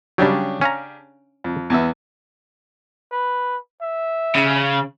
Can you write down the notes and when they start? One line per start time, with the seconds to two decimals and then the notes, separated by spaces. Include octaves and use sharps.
0.18 C#3 F#3 G3 D4 G4
0.61 C#4 F5 A#5
1.44 F2
1.70 E2 B3 E5
3.11 B4
3.82 E5
4.35 C#3